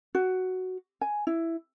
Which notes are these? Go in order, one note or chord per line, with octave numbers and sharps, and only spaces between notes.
F#4
G#5
E4